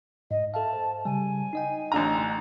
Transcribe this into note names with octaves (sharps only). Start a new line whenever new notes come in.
G#2 D#5
A4 E5 F5 A5
C5
C#3 G3 G#5
D#4 D#5 G5
A1 D3 A#5